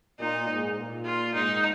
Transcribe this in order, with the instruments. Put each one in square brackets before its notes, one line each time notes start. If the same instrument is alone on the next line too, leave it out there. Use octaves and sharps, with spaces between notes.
[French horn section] A#2 [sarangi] D#4
[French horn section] G#2
A#2
[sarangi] F4
[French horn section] G#2 [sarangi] D#4